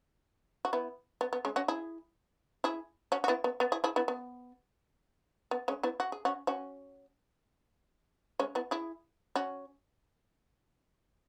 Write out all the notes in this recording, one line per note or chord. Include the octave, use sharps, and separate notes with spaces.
F#4
B3 E4
B3
B3
G#3 C#4
C#4 F#4
E4 G#4
E4 G#4
C#4 F#4
F#4
B3 E4
B3
B3
E4 G#4
E4 G#4
B3 E4
B3
B3
G#3 C#4
B3 E4
F#4
G#4
C#4 F#4
C#4 F#4
G#3 C#4
B3 E4
E4 G#4
C#4 F#4